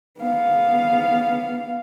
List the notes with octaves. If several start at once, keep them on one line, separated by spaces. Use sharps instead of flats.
B3 F5